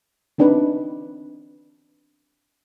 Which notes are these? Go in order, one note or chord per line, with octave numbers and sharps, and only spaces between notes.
B3 C4 D4 D#4 B4